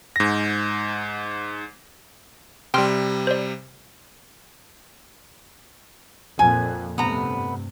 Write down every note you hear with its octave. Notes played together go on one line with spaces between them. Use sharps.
G#2 A#6
C3 G3 G5 C6 F6
C5 D5
F2 A#2 G#5
G2 C3 A3 B3 A#5